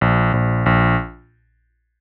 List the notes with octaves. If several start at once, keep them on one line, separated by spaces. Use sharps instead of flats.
A#1
A#1
A#1